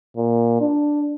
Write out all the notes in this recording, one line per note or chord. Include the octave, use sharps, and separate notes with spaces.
A#2
D4